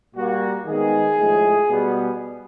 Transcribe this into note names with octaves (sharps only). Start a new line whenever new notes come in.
A#2 G3 A#3 F#4
D#3 G#3 B3 G#4
A2 F3 G#3
B2 G3 B3